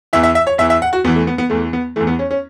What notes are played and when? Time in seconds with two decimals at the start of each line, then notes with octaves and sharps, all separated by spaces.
0.13 E2 E3 E5
0.23 E5
0.35 E5
0.47 C#5
0.58 E2 E3 E5
0.70 E5
0.82 F#5
0.93 F#4
1.04 E2 B3
1.07 E3
1.15 A3
1.27 B3
1.38 B3
1.50 E2 E3 A3
1.73 B3
1.96 E2 E3 A3
2.07 B3
2.19 C#4
2.31 C#4